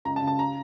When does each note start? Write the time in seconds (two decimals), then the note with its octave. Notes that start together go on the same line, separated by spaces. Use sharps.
0.05 C#2 A#5
0.16 A5
0.22 C#3
0.27 A5
0.39 A#5